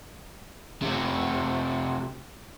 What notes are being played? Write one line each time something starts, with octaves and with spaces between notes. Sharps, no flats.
C3 A3